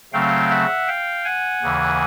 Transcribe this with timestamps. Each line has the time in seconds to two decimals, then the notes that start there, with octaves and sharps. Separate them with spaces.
0.13 C#3 F#3 A3 C4 F5 G5
0.50 E5 F#5
0.87 F5 G5
1.25 F#5 G#5
1.62 D#2 C#3 E3